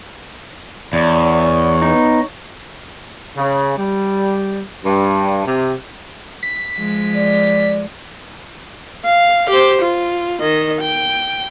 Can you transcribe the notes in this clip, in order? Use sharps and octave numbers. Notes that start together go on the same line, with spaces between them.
E2 C#5 D5
B3 D#4
C#3
G3
G2
C3
B6
F3 G#3
D5
F5
G4 C5
F4
D#3 D#5
G5